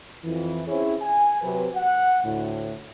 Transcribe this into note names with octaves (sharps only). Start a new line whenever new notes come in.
F2 E3
C4 C#4 E4 G#4 C5 C#5
G#5
C3 F#3 B4
F#5
D2 A2